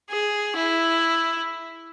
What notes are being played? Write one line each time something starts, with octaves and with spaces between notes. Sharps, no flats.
G#4
E4